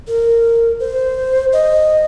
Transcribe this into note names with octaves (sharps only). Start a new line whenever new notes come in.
A#4
C5
D#5